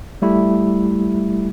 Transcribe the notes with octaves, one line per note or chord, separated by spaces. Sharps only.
G3 A3 E4 G4